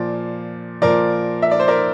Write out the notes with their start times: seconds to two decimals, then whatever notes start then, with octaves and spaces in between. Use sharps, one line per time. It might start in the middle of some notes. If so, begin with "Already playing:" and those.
Already playing: A#2 F3 D5
0.82 A#2 F3 A#4 D5
1.42 E5
1.51 D5
1.60 C5
1.68 A#4 D5